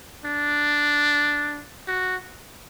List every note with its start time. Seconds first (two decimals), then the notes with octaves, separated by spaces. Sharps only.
0.25 D4
1.87 F#4